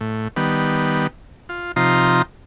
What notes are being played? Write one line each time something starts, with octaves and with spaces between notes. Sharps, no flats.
A2
D#3 G3 B3
F4
C3 F3 D#4 F4 A#5 C6